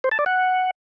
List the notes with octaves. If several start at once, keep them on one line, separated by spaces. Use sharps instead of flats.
C5
A5
D5
F#5